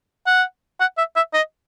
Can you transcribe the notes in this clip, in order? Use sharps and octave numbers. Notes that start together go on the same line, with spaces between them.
F#5
F#5
E5
E5
D#5